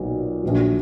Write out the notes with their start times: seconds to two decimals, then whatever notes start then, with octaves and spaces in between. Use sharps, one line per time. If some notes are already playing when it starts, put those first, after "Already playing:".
Already playing: B1 A#2 F#3
0.43 A#1 A#2 F#3